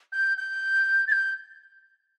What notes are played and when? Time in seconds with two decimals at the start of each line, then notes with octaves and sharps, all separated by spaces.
0.12 G6
0.37 G6
1.07 A6
1.12 G6